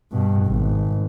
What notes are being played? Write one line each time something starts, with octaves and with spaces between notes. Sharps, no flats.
G2 B2
G#1